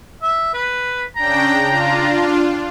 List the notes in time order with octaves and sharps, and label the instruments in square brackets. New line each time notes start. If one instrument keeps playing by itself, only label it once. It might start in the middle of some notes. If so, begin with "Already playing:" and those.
[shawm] E5
B4
[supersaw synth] C#3 D4 G5 [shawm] A#5
[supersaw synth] D4 F4